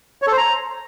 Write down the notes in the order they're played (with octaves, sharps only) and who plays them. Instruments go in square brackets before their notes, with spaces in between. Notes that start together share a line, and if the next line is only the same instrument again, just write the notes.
[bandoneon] C#5
A4
C5
A#5